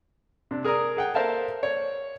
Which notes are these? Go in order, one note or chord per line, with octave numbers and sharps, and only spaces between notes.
C3 D4
G#4 A#4 D5 A#5 D#6
G#4 F#5 G5
A4 A#4 C5 E5 F5 A5
C#5 D5